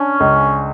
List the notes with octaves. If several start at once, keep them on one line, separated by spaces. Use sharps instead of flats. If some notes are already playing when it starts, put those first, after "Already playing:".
Already playing: C#4 D4
C#2